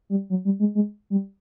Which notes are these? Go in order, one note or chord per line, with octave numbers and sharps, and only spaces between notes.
G3
F#3
G3
G#3
G#3
G3